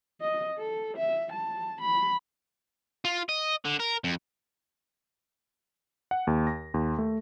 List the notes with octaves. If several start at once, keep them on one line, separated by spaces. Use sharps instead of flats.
D#5
A4
E5
A5
B5
F4
D#5
D3
A#4
F2
F#5
D#2
A#6
D#2
A3